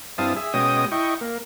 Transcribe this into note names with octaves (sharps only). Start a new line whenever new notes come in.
G2 C4 E4 F5 A5 D#6
G#4 E5
B2 G#3 C#4 D#5 G5 D#6
E4 D#5 G5 C#6
A#3